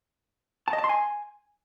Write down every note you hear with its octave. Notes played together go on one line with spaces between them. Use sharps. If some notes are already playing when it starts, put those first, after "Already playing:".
A5
D#5
A5
C6
G#5